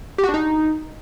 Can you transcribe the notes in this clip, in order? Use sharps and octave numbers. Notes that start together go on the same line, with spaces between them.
G4
F#4
D4
D#4